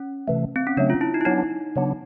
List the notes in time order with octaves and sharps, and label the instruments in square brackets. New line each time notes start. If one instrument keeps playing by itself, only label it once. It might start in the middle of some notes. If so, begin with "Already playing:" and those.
Already playing: [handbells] C#4
[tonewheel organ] C3 E3 A3
[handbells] C4
C#4
[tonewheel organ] C#3 F#3 A3 [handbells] D4
[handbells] F4
E4
D#4
E4
[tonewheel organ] F#3 B3 D4 [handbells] D#4
[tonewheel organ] C#3 F#3 B3 D4